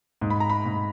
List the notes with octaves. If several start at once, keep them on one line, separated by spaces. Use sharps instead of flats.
G#2
B5
A#5
B5
G#2